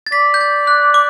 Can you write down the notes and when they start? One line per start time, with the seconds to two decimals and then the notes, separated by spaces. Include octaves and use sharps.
0.07 A6
0.12 D5 B6
0.34 G6
0.41 A6
0.67 F#6
0.94 D6